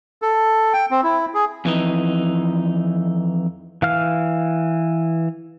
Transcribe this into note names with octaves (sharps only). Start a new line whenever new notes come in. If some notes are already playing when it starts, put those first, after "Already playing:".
A4
G5
C4
E4
G#4
F2 E3 D#4
E3 F5 F6